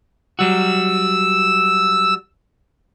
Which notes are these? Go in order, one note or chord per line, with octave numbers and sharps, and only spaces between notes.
F#3 G3 F#4 E6